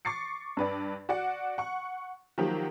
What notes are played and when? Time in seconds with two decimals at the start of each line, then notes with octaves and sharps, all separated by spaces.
0.05 C#6 D6 A6 C7 C#7
0.57 G2 B4 D5
1.09 F#4 D5 F#5
1.58 F#5 C#6
2.38 D#3 F3 F#3 A#3 G4